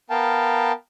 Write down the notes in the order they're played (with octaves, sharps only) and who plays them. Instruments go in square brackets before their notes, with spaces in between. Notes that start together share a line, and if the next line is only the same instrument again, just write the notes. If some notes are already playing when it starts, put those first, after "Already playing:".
[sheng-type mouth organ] B3 A#4 F5 G5 A5